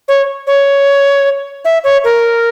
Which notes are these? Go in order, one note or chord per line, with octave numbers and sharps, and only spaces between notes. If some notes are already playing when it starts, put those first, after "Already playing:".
C#5
C#5
E5
C#5
A#4